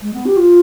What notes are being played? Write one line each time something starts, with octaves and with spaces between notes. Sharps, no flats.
G#3
B3
G4
F4